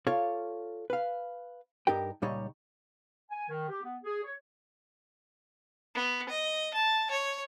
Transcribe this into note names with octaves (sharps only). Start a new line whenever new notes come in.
F4 A4 C#5 D5 F5
B4 F5
G2 D#4 G4 A#4 G5
C#2 A#2 G3 D#4 C#5
G#5
D#3
G4
B3
G#4
C#5
B3
D#5
A5
C#5